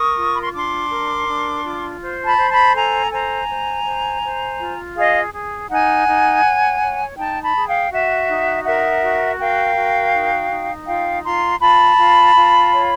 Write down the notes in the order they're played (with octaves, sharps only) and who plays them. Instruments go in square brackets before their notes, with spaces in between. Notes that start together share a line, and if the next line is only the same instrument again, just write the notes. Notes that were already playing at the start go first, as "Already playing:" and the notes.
Already playing: [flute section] A#4 C#6 D#6
F4
B5
C6
C#6
D4 C6 D6
A#4
D4
F4
C5
A5 B5
C5
A5 B5
A4 G#5 A#5
C5 G#5 A#5
C5
C5
C5
F4
G#4 D#5 F5
G#4
D#4 F#5 G#5
D#4
C#5
C#5
D#4 G5 A5
A5 B5
G#4
F5 G5
F#4 E5 F#5
D#4
A#4 E5 F#5
F#4
A#4 F5 G5
F#4
D#4
D#4
F4 F5 G5
F4 A#5 C6
F4 A5 B5
F4
F4
C#5